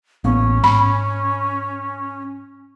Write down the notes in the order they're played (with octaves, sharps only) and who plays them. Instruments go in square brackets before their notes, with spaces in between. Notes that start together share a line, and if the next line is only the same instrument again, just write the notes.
[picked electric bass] A1 A#3 B3 [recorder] C#4
[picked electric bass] G#2 [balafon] B5